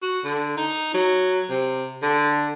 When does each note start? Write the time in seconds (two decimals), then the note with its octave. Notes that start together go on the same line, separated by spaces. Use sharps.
0.02 F#4
0.24 D3
0.57 D#4
0.94 F#3
1.50 C3
2.02 D3